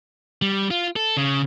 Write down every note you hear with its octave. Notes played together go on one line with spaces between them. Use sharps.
G3
F4
A4
C#3